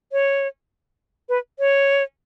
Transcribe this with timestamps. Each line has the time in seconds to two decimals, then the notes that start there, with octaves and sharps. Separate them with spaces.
0.12 C#5
1.29 B4
1.59 C#5